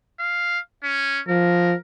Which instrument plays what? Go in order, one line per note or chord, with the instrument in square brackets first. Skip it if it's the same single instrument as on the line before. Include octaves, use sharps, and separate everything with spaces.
[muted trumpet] F5
C#4
[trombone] F3 [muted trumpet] A#4